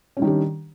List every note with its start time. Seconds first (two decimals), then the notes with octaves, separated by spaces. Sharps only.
0.17 C#4
0.19 G3
0.22 D#3
0.24 D4
0.27 G4